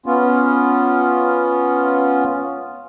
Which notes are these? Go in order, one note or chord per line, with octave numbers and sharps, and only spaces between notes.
B3 C#4 F4